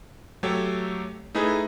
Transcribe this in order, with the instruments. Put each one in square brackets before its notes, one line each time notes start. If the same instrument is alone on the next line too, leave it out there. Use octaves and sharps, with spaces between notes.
[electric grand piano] F#3 A3 G4 A4 C#5
A3 D#4 E4 G#4 B4